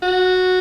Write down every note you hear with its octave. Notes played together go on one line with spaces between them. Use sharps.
F#4